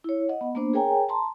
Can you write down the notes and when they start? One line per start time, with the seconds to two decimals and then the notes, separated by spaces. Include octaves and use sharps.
0.04 E4 C#5
0.29 D#5 F#5
0.41 B3
0.55 A#3 B3 D4 C5
0.73 G#4 A#4 C#5 G5 G#5 A#5
1.09 A5 A#5 C6